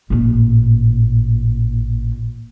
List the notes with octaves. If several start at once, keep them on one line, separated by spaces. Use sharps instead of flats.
A1 A#2